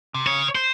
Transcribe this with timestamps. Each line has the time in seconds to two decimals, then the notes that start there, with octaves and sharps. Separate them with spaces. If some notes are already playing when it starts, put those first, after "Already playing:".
0.14 C3
0.27 C#3 C#5
0.55 C5